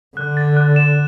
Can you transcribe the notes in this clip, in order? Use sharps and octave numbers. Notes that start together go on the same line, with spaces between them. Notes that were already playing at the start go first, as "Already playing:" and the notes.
D3 F#6
A6
F#6
E7